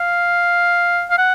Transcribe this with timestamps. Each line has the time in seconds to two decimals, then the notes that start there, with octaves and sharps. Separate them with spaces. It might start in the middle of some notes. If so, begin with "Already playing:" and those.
Already playing: F5
1.10 F5
1.18 F#5